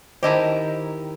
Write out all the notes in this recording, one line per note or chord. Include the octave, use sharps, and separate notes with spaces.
D#3 E4 G4 C5 D#5 A5